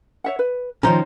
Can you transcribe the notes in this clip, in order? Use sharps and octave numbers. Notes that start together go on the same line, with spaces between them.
C#5 E5 F#5
B4
D3 D#3 F3 C#4 D#4 C5 A#5